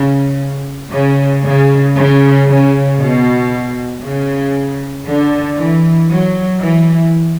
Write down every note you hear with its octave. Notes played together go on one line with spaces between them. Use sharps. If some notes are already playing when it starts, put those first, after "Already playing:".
Already playing: C#3
C#3
C#3
C#3
C#3
B2
C#3
D3
E3
F#3
E3